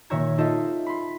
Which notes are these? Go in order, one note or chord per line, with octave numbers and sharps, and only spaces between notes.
A#2 D#3 C#5 E5 A#5 G#6
D#4 F4 G4 A4 D#5 E5
B5 C6